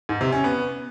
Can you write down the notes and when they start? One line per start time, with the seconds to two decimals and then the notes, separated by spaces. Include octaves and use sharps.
0.09 G#2
0.21 C3
0.32 C#4
0.44 B3